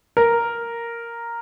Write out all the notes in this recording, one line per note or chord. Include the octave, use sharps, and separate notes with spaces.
A#4